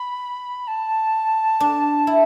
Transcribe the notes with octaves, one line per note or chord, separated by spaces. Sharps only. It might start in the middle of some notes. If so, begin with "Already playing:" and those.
Already playing: B5
A5
D4
E4